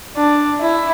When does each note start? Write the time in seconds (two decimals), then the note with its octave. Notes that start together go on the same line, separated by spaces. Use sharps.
0.16 D4
0.61 E4